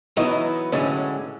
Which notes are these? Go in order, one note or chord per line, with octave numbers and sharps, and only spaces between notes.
E3 F#3 B3 D#4 E4 D#5
A2 D3 F#3 G#3 C#4